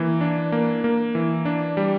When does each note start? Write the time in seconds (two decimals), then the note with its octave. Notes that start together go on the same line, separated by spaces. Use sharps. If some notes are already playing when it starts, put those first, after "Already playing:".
Already playing: E3 A#3
0.21 D4
0.52 A#3
0.84 A#3
1.15 E3
1.45 D4
1.77 G3